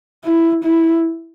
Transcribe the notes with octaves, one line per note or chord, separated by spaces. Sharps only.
E4
E4